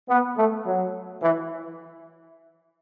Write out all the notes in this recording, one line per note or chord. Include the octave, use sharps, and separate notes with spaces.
B3
A3
F#3
E3